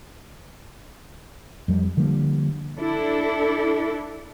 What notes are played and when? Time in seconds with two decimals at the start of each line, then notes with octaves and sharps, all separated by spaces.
1.68 F2 G3
1.97 D3 F3 G3 A#3
2.78 D4 E4 A4